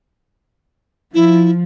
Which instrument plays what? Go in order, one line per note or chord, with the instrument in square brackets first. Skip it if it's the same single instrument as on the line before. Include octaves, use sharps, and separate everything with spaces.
[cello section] F3 [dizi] E4